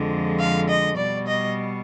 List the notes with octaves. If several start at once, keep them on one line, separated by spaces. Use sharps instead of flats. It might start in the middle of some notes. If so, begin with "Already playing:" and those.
Already playing: F2 D3 F3 G#3
F5
D#5
B2 G3 D5
D#5